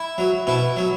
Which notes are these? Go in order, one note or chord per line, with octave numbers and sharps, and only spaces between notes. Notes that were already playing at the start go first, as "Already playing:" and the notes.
Already playing: E4
F#3
B2 E4
F#3